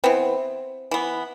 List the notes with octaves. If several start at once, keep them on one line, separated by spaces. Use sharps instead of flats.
E3 B3 C4
E3 B3